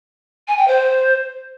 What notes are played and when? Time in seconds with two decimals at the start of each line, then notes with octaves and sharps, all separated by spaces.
0.47 G#5
0.57 G5
0.67 C5